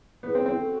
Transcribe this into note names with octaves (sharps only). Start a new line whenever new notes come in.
B3 E4 G#4 C5
C4
C4
C#4 F#4 A4